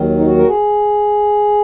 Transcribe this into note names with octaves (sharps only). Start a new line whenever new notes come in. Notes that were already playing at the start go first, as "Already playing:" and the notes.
Already playing: D#2 D#3 F#3
D#4
F#4
A#4
G#4